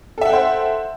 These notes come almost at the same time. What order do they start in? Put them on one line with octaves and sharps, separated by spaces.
A4 E5 F#5 G5 C5